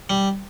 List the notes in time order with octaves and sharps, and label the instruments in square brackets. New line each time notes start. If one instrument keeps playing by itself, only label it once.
[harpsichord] G3